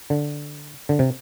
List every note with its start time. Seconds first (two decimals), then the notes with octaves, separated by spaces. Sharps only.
0.10 D3
0.89 D3
0.99 C3